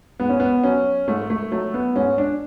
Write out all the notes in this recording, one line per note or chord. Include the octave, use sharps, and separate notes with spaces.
G#2 B3
C#4
B3
F#3 C#4
G#2 A3
A3
F#3 A3
B3
G#2 C#4
D4